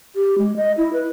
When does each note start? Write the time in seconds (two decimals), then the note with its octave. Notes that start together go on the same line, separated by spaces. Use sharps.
0.16 G4
0.38 G#3
0.56 D#5
0.77 E4
0.93 B4